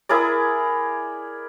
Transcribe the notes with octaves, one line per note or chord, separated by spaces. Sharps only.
E4 G#4 A#4 D5